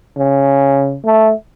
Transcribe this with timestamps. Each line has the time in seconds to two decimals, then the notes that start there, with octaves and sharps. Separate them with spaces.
0.18 C#3
1.05 A3